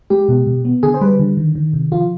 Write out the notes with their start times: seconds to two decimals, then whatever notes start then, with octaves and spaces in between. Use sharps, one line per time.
0.10 G#3 G4
0.28 B2
0.47 B2
0.65 B3
0.83 D3 G#4
0.94 C5
1.01 G3 B4
1.19 D3
1.37 D#3
1.55 D#3
1.73 C3
1.92 F3 F4